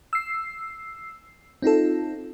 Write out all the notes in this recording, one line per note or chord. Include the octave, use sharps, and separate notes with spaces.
E6 C7
C4 D#4 F4 A4